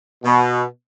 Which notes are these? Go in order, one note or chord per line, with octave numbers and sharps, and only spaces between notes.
B2